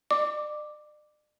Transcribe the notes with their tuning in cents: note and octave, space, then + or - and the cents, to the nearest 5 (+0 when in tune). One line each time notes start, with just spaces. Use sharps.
D5 +40 D6 +0